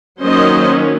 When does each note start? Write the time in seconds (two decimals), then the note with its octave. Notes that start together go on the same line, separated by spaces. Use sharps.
0.23 D#3 F#3 A#3 C#4 C5 D#5